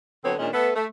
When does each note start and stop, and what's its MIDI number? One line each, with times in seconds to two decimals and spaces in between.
0.25 0.34 50
0.25 0.34 54
0.25 0.34 59
0.25 0.34 60
0.25 0.34 73
0.39 0.49 46
0.39 0.49 51
0.39 0.49 56
0.39 0.49 61
0.39 0.49 62
0.53 0.71 57
0.53 0.71 59
0.53 0.71 69
0.53 0.71 71
0.75 0.86 57